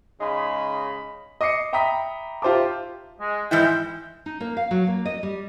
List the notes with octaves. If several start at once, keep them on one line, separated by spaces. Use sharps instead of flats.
C#3 G#3 D#4 B5
D#5 D6 D#6 C7 C#7
E5 G5 A#5 B5 D#6 B6
F4 G4 C5 E5 A5 D6
G#3
G#2 E3 E4 G5
D#4
A#3
F5
F#3
A#3
D#5
G3